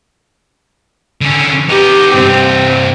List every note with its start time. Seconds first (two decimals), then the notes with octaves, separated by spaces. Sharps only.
1.21 D3 C#4
1.69 B3 D#4 G4
2.14 G2 C3 C4